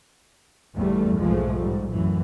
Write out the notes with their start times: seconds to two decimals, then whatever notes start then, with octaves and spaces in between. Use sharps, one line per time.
0.77 G1 E2 G2 G3 A3
1.17 B1 G#2 F3 G#3 A3
1.61 G#2 G3
1.90 A1 F#2 A2 E3